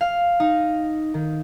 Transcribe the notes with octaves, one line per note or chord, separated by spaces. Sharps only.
F5
D#4
D#3